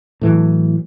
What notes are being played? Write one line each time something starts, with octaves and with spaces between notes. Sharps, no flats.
A2 E3 F#3